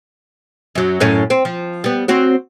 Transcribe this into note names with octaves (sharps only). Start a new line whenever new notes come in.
F#2 F#3
F#2 A2 C#4
C4
F3
G3 B3
C4 F#4 C#5